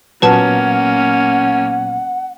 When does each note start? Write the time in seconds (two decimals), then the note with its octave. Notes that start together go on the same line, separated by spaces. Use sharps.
0.22 A#2 F#3 A#3 B3 C#4 B4 F#5 A5